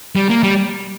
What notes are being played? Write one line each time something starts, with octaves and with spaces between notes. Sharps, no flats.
G3
A#3
G3